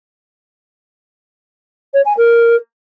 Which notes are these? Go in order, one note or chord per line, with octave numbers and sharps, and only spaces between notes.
C#5
G#5
A#4